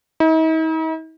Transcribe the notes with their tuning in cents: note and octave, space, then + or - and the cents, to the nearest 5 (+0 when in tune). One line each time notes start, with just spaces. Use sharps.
D#4 +45